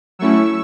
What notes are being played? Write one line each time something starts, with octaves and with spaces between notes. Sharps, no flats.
F#3 A3 C#4 E4 C#6 E6